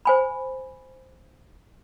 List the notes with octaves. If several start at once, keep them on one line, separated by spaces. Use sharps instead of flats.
C5 G#5 B5